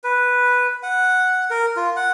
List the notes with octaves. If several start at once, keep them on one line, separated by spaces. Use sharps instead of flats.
B4
F#5
A#4
F4
F#5